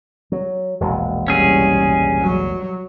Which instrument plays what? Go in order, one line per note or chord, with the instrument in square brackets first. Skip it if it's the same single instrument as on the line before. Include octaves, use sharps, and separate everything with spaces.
[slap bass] F#3
E1 A#1 G#3
[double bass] C2 [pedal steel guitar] C#4 G#4
[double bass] F#3